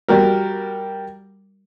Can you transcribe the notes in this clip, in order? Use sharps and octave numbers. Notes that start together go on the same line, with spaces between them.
G3 F#4 A#4